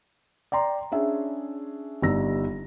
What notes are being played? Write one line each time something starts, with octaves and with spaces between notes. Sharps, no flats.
D5 G5 A#5 C6
C#4 D4 G#4 E5
G1 G2 G3 D#4 E6 A#6